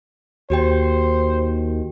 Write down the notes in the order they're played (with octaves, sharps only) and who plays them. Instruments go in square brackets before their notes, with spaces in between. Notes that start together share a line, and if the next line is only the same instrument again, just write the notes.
[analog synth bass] D#2 [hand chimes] F#4 G4 G5 [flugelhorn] C5